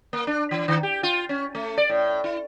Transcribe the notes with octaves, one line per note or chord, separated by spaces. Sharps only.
A#3
D4
E3
D#3
G4
F4
C#4
A3
D5
A2
E4